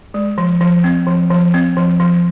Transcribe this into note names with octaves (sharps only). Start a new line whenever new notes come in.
G#3
F3
F3
C4
F3
F3
C4
F3
F3